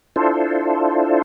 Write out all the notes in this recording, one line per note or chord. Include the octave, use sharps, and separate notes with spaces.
D4 E4 F4 A4 C5